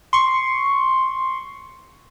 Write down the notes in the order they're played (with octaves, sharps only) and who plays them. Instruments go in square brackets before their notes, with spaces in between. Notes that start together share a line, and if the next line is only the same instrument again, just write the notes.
[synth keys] C6 C#6